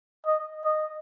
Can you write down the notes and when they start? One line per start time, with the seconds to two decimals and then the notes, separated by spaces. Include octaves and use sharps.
0.26 D#5
0.64 D#5